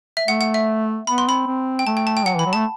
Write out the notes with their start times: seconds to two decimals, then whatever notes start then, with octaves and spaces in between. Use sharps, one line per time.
0.17 E5
0.28 A3 F#5
0.41 F#5
0.54 E5
1.07 B3 B5
1.18 C6
1.28 C4 B5
1.47 C4
1.79 G5
1.87 A3 A5
1.97 G5
2.07 A5
2.17 G5
2.26 F#3 F#5
2.36 E3 B5
2.46 F#3
2.53 A3 A5